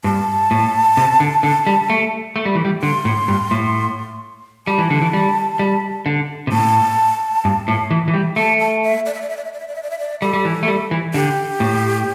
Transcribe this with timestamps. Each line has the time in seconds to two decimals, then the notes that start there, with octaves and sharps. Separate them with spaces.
0.04 G2 A5
0.51 A2
0.97 C3
1.20 D3
1.43 D3
1.67 G3
1.90 A3
2.36 A3
2.46 G3
2.55 E3
2.65 G3
2.82 D3 C6
3.05 A2
3.28 G2
3.51 A2
4.67 G3 A5
4.78 E3
4.90 D3
5.02 E3
5.13 G3
5.59 G3
6.06 D3
6.47 C3
6.52 A2 A5
7.45 G2
7.68 A2
7.91 E3
8.08 E3
8.14 G3
8.36 A3 A5
8.60 A5
8.84 E5
9.06 D5
9.14 E5
9.22 D5
9.30 E5
9.37 D5
9.45 E5
9.53 D5
9.60 E5
9.68 D5
9.75 E5
9.83 D5
9.91 E5
9.99 D5
10.21 G3 A4
10.33 G3
10.45 E3
10.63 A3
10.68 G3
10.91 E3
11.14 D3 G4
11.60 A2